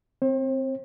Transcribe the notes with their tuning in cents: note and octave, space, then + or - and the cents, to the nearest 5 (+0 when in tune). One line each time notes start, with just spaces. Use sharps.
C4 +0 C5 +40